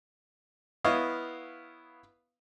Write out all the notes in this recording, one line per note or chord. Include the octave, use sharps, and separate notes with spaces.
B3 E4 C#5 D#5 F5